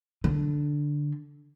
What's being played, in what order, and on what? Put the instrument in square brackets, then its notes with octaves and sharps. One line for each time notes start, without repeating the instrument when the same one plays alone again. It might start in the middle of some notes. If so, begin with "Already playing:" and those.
[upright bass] D3